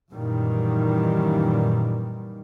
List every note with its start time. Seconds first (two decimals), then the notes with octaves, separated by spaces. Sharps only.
0.12 F#2 A#2 D#3 E3 G3